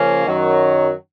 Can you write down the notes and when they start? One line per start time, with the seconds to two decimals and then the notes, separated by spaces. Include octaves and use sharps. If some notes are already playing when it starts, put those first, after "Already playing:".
Already playing: C#3 F3 A#3 C#4
0.26 F#2 D#3 F#3